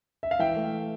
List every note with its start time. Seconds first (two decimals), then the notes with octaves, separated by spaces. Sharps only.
0.23 E5
0.31 F5
0.39 E3 E5 G5
0.56 A3